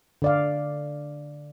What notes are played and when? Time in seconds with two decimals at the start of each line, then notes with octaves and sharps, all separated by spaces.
0.22 D3 D5 F5